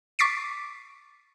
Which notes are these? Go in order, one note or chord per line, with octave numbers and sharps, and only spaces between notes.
C#6 D6 A6 B6 C7 D7